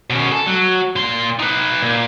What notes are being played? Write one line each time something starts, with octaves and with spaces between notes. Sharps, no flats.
B2 C#4
A4
F#3
A#2 C6
D#4 B4
A#2